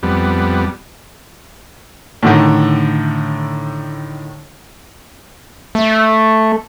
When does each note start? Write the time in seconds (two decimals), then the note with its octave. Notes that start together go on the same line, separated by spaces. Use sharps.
0.03 F2 G3 B3
2.23 A2 D3 D#3
5.75 A3